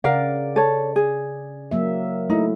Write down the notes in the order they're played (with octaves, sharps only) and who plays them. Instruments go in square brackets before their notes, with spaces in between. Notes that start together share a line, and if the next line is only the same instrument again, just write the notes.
[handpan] C#3 D5 [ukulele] A#4 F5 F#5
[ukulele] A4 C#5
G#4
[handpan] F#3 A#3 E5
[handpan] A3 E4 [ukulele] D#4